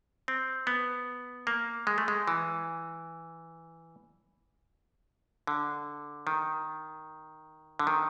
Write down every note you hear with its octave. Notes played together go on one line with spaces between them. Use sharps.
C4
B3
A#3
G#3
A3
G#3
E3
D3
D#3
D3
D#3